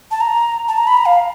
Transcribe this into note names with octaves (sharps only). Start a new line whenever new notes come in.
A5
A#5
A5
A#5
B5
A#5
F5